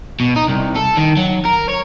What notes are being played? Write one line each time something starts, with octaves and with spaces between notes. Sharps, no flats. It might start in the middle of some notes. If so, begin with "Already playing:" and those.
B2
D#4
C2
A4
D#3
F#3
A#4
C#5